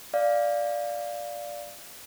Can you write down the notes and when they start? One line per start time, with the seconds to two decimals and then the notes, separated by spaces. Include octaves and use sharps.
0.14 D5 F5